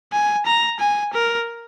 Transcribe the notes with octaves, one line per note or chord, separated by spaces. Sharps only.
G#5
A#5
G#5
A#4